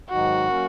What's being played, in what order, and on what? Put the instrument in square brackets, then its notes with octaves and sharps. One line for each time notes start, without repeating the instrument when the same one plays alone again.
[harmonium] G#2 D#3 F#3 D#4 [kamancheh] F#4
[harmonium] F#3 A#3 C#4 A#4